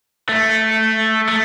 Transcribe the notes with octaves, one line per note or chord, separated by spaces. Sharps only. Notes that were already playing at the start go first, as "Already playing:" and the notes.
A3
A3